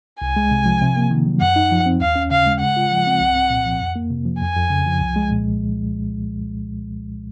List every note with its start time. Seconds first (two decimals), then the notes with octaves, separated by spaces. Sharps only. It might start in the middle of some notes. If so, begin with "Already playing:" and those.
0.21 C2 G#5
0.36 G#3
0.51 C3
0.66 F3
0.82 C3
0.96 A#3
1.11 D#3
1.26 F#3
1.41 F#2 F#5
1.56 D#4
1.71 F3
1.86 C4
2.01 D#2 F5
2.16 C#4
2.31 C#3 F5
2.46 G#3
2.61 C#3 F#5
2.77 F4
2.91 F3
3.07 C4
3.20 C2
3.35 C4
3.50 A#2
3.66 F3
3.81 F2
3.96 A#3
4.10 C3
4.26 F3
4.41 F2 G#5
4.56 F2
4.70 C#3
4.86 F3
5.00 C2
5.16 G#3
5.31 A#2